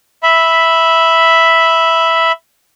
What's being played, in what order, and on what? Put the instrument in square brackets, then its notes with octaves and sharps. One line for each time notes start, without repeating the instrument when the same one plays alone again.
[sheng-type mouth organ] E5 B5